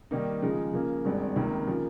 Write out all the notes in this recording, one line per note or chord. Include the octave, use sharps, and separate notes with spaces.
D#3 G3 A#3 D#4
C#3 F3 G#3 D#4
C#3 F3 A#3
G#1 G2 D#3 G#3 C4
C#2 C3 D#3 A#3 D#4
C#3 F3 A#3